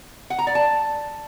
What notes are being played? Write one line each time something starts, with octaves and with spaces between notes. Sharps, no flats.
F#5
A#5
D5
A5